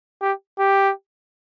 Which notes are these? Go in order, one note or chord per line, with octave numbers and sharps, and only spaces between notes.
G4
G4